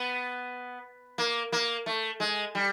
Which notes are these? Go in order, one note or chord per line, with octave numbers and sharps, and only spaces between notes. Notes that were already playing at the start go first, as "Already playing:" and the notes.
Already playing: B3
A#3
A#3
A3
G#3
G3